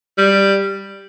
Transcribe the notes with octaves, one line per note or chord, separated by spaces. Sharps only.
G3